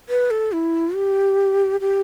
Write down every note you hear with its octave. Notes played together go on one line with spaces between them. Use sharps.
B4
A4
E4
G4
G4